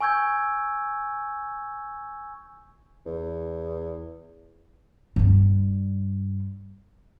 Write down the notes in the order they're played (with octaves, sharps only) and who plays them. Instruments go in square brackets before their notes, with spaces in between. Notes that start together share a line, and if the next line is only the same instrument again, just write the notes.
[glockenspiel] G#5 C#6 E6 G6 G#6
[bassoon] E2
[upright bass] G2 G3